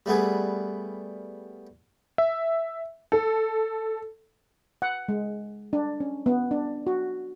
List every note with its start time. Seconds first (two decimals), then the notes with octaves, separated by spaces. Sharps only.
0.06 G3 A3 B3 G#4
2.18 E5
3.12 A4
4.82 F#5
5.09 G#3
5.73 D4
6.00 C#4
6.26 B3
6.51 D4
6.87 F#4